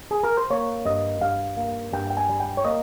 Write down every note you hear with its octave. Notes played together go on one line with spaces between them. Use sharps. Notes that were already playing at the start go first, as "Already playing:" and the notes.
G#4
A#4
C5
A#3 C#5
G2 D#5
G2 F5
A#3
G2 G5
G5
G#5
G3
G5
C#5
A#3 D#5